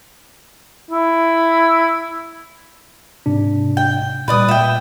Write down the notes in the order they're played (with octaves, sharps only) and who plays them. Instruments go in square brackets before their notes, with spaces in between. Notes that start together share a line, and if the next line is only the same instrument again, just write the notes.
[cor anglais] E4
[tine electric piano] G#2 C3 D4
[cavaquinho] G5
[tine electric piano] A#2 G3 [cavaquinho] B4 D5 D#6
[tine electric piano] A#2 [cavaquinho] E5 G5